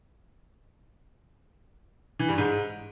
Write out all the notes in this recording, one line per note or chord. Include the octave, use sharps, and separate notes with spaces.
E3
G2
G#2